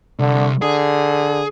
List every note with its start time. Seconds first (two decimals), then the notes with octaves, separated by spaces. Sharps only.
0.19 C2 D3
0.62 D3 G#4